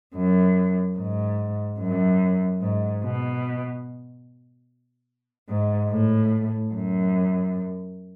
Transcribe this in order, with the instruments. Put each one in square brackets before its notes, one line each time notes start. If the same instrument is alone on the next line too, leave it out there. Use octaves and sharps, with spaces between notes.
[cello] F#2
G#2
F#2
G#2
B2
G#2
A2
F#2